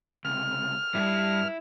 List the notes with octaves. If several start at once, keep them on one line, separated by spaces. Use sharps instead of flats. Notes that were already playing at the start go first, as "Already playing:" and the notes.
C#2 C3 F6
G2 G3 E4